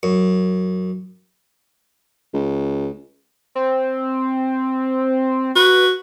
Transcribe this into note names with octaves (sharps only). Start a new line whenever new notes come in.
F#2
C#2
C4
F#4 B4